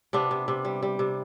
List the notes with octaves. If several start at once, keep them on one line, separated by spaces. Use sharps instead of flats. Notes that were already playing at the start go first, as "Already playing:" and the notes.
C3 B3 D4
C3
C3
G3
G3
C3